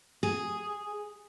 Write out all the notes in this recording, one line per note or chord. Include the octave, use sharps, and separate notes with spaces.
G#4